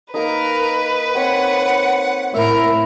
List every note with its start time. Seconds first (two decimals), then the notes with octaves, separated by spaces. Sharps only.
0.14 A#3 D#4 A#4 B4
1.15 C4 C#5 F#5
2.34 A2 E4 A#4 E5